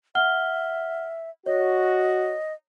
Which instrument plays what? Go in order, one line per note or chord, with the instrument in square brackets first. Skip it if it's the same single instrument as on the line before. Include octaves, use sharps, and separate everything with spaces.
[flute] E5 [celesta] F#5 F6 G7
[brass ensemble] F#4 [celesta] C#5 [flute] D#5